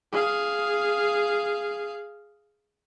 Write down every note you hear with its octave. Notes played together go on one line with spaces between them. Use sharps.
G#4 F5